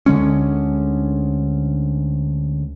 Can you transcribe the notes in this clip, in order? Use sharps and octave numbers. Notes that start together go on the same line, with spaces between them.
D2 D3 G#3 C#4